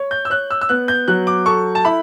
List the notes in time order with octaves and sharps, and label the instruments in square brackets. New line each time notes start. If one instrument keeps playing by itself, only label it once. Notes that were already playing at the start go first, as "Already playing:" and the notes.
Already playing: [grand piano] C#5
[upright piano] G6
E6
[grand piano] C#5 [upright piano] F#6
[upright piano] E6
E6
[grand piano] B3 [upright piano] F#6
[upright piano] G6
[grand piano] F#3 [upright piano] F#6
[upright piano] D6
[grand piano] A4 [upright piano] C#6
[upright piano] A5
[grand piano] E4 [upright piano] B5